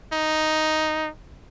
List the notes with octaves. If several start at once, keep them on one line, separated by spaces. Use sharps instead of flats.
D#4